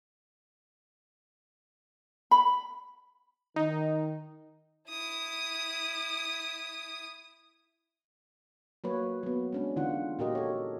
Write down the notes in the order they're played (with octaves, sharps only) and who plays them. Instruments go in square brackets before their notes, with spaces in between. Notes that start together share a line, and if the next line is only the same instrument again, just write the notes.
[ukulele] B5
[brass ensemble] D#3 [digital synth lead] D#4
[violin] E4 D#6
[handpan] F#3 A#3 B4 C#5
F#3 B3
G#3 C#4 D4
D3 E3 D#4 F4 F#5
A#2 F#4 G4 A#4 D#5
A4 C#5